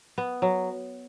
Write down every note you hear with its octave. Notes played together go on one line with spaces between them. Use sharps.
B3
F#3